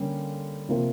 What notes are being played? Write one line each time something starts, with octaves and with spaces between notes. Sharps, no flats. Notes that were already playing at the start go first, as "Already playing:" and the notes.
Already playing: D3 G3 A#3 C#4
C3 F3 A#3